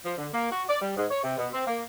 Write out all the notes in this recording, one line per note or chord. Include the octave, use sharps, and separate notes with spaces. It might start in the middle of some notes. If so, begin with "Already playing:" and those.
F3
D3
A#3
F#4
D5
G3
G#2
C#5
C3
B2
C4
A#3